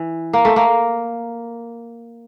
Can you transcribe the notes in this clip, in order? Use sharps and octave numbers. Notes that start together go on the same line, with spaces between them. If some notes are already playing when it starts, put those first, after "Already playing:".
Already playing: E3
A#3
A3
A#3